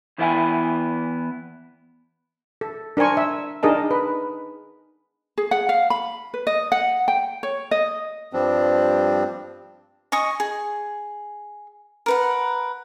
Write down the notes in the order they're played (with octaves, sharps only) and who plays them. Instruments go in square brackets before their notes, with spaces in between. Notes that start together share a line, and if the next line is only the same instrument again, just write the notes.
[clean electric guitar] E2 E3 B3 E4 G5 G#5
[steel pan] A4
D4 A#4 C5 G#5 C#6
E5
D4 D#4 G#4 A#4 D#5 A5
B4
[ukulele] G#4
F#5
F5
B5
B4
D#5
F#5
G5
C#5
D#5
[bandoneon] G2 F3 G3 C4 D4
[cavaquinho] D#5 G#5 C#6 D#6
G#4
A#4 B4 F#5